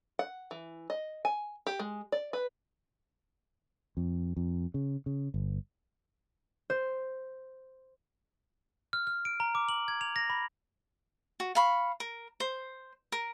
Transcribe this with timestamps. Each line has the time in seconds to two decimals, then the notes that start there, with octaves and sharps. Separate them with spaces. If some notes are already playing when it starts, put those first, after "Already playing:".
0.19 F#5
0.51 E3
0.90 D#5
1.25 G#5
1.67 G4
1.80 G#3
2.12 D5
2.33 B4
3.97 F2
4.37 F2
4.74 C#3
5.06 C#3
5.34 G1
6.70 C5
8.93 F6
9.07 F6
9.25 D7
9.40 A#5
9.55 D6
9.69 F#7
9.88 G#6
10.01 F7
10.16 A#6
10.30 B5
11.40 F#4
11.55 F5 B5 C#6
12.00 A#4
12.40 C5
13.12 A#4